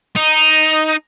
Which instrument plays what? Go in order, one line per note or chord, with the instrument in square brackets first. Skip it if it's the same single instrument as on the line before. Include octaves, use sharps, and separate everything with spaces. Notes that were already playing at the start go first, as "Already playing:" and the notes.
[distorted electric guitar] D#4